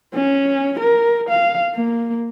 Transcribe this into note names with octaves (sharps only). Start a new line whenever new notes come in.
C#4
A#4
F5
A#3